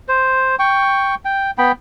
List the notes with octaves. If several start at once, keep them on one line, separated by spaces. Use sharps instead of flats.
C5
G5 C#6
G5
B3 G5 B5